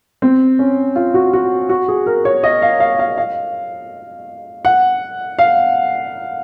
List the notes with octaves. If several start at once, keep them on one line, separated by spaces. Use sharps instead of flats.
C4
C#4
F4
F#4
F#4
F#4
G#4
A#4
C#5
D#5
F5
F5
F5
F5
F#5
F5